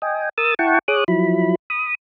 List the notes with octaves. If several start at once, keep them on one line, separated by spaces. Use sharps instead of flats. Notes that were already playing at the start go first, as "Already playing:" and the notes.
D#5 G5 G#5
A#4 D#6 E6 A6
E4 F#5 G5 A5 C#6
G#4 C#5 D6 D#6 F#6
F3 F#3 E4 B5
B5 D#6